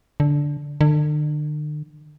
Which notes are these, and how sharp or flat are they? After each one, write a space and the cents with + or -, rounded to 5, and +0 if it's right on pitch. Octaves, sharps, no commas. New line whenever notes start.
D3 -10
D3 +40